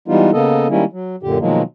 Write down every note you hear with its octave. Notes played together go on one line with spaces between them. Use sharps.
E3 G3 G#3 B3 D#4 F4
C#3 A#3 B3 A4 D#5
D#3 G3 G#3 A#3 C#4 E4
F#3
F#2 A#2 D3 G4
B2 D#3 F3 F#3 G#3 A#3